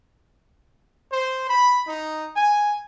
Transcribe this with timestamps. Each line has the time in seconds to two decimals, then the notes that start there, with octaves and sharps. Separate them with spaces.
1.13 C5
1.50 B5
1.88 D#4
2.37 G#5